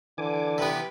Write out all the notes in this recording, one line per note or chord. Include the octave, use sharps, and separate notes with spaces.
D3 E3 G#5 D6
C3 B3 G4 B4